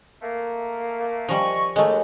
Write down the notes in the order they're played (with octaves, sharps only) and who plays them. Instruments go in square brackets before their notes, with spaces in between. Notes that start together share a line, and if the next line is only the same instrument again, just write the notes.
[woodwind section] A3 A#3
[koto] F3 G3 [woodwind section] D#5 G#5 C#6
[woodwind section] D#2 [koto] G#3 A3